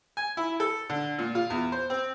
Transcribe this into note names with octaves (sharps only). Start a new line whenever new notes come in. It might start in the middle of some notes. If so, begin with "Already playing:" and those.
G#5
E4
A4
D3
A#2
F4
E2
C5
C4